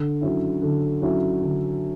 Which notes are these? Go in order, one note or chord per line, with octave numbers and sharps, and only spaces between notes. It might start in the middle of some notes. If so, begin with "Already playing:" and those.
Already playing: D3
F#3 C#4 E4
D3
F#3 C#4 E4
D3